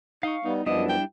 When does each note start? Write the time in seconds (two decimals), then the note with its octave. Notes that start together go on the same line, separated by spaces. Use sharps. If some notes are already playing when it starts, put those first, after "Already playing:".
0.23 D#4 F5 C#6
0.44 G3 B3 D#4
0.66 F#2 F3 G3 B3 D4 E4 D#5
0.89 G5